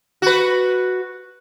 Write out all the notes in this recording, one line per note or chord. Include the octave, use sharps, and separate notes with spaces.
F#4 B4